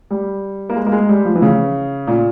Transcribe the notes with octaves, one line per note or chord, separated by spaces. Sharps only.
G3
A#3
G#3
A#3
G#3
G3
F3
E3
C#3
A#2